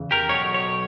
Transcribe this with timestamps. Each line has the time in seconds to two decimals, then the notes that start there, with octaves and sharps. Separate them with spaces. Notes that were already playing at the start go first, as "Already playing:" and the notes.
Already playing: E2 C#3 E3
0.11 G4 A#4
0.29 B1 B2 C#5
0.54 C#5